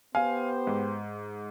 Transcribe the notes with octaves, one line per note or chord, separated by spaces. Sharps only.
B3 G4 C5 F5 G#5
G#2